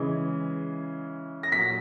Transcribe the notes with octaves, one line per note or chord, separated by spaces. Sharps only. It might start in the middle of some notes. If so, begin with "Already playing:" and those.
Already playing: C#3 E3 G#3
A#6
A#2 F#3 B6